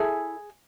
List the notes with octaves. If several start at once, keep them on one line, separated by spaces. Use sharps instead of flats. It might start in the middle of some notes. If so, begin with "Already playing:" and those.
Already playing: E4 G#4 A4 G#5